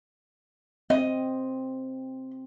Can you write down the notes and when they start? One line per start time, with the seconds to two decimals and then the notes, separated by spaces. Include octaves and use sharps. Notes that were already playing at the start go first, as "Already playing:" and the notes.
0.90 C4 D#5